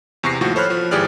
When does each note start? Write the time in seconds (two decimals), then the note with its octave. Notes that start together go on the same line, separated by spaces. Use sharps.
0.23 E2 C3 C#6 A#6 C7
0.41 D#2 A2 F3 F#4 C#6
0.55 A4 C5 C#5 B5 F6 F#6
0.70 F3
0.91 G#1 E3 G4 G#4 D5 F6